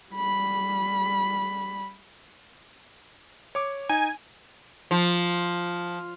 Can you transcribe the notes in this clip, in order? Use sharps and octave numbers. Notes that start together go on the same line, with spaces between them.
G3 B5
C#5 D6
D#4 G#5
F3